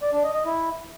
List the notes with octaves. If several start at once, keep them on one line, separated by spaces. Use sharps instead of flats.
D5
D4
D#5
D#5
E4